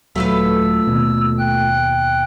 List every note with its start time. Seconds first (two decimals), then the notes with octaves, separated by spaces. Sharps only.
0.15 D#1 F#3 A3 F4 B4 E6
0.87 D#2 B2
1.39 G5 F#6